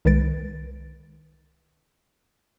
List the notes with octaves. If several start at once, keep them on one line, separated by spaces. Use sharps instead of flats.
C2 D#3 G#3 B4 A6 D7